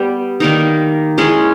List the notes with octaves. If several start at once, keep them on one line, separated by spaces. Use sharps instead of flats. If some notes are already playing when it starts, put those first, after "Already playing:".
Already playing: G3 B3 G4
D#3 G3 A#3 D#4
E3 G#3 C#4 G#4